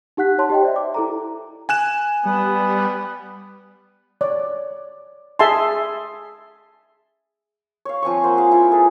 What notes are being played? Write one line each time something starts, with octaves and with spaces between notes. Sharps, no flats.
D#4 G4 F#5 F#6 B6
C#5 A5 C6
G4 D#5 G5
C5 D5 E5
D6
E4 A4 A#5
G#5 F#6 E7
G3 B3
C#5 D5
G#4 E5 G#5 A5 C6
C#5 F5
F3 C4 G#5 C#6
A#3 C5 F#5
G#4 F5
E4 F4
G#4 A4 B4